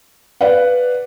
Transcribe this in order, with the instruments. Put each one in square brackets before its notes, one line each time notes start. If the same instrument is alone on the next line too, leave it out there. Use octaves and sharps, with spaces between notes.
[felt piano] B4 D5 F5 F#5